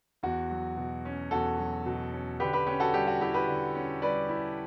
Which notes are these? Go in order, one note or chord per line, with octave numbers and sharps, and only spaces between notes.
E2 F#4
F#3
B2
C#4
E2 F#4 A4
F#3
B2
C#4
D3 G4 B4
G4 B4
C#4 G4
F#4 A4
G3 G4
F#4
E4 G4
G4 B4
D3
C#4
G3 B4 D5
E4